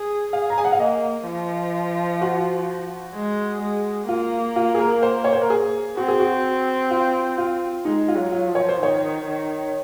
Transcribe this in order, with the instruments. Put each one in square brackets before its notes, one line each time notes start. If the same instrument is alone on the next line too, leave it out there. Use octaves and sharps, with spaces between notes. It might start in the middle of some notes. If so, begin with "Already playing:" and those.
Already playing: [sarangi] G#4
[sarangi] G#4 [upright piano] F5
[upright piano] A#5
G#5
F#5
F5
[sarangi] A#3 [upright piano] D#5
[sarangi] F3
[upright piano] F#4
[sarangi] G#3
G#3
[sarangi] A#3 [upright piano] F4
[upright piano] F4
G#4
A#4
C5
C#5
C5
A#4
G#4
[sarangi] C4 [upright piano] F#4
[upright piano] G#4
F#4
F4
F4
[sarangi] G#3 [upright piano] D#4
[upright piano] F4
[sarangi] F#3
[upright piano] F4
[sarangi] F3
[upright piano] C#5
C5
[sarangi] D#3 [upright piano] C#5
[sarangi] D#3